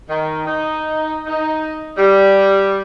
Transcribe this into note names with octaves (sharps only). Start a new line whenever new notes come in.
D#3
D#4
D#4
G3